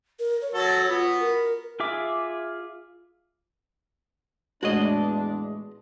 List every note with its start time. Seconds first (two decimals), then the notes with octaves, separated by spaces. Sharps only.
0.20 A#4
0.42 C#5
0.54 F#3 F#4 A4
0.89 B3 F4 F#4
1.20 A#4
1.80 F4 G#4 E5 D6
4.63 E2 A2 G#3 D4 F#4 C#5 D#5